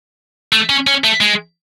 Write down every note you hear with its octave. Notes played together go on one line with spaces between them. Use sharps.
A3
C#4
C#4
A3
G#3